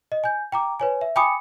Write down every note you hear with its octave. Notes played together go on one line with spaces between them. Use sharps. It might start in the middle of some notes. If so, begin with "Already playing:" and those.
D#5
G#5 G6
G5 A#5 D6
B4 C#5 G#5
E5
G5 G#5 B5 D6 D#6 C#7